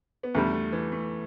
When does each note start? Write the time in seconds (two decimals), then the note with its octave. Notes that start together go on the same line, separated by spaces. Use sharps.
0.23 B3
0.34 E2 D3 G3 A3
0.53 A3
0.72 E3
0.92 A3